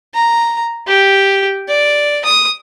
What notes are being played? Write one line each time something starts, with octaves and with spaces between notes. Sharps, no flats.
A#5
G4
D5
D#6